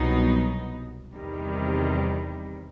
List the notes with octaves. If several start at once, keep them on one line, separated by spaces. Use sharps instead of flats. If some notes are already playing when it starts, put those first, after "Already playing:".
Already playing: C2 B2 F#3 B3 D#4
E2 C3 D#3 G3